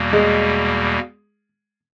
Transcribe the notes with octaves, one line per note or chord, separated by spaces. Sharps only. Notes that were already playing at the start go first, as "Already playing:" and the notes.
Already playing: E2 B2 G3 A#3
G#3